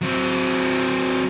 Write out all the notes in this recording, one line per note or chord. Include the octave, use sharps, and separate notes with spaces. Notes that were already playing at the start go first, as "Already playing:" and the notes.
F#3 C4